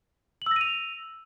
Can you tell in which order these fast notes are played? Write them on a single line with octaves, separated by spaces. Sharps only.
F#7 E6 A#6 D#7 F7